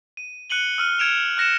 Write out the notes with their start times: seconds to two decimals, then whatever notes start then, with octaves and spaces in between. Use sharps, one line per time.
0.17 D#7
0.50 F#6 C#7 D#7 F#7 G7
0.78 E6 F6 D#7
0.99 F6 G#6 C#7 D7 E7 F7
1.37 F6 F#6 A#6 C#7 E7